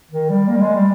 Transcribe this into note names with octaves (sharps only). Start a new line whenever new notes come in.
D#3
G3
A#3
G3
G#3
G3